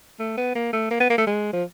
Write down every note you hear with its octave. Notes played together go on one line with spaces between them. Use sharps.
A3
B3
A#3
A3
A#3
B3
A#3
A3
G#3
F3